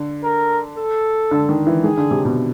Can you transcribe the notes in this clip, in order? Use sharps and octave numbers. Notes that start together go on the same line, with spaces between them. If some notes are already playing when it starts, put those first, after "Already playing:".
Already playing: D3
A#4
A4
D3
D#3
E3
D#3 G#4
D3
C3
B2